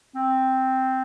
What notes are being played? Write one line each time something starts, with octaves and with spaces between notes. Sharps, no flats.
C4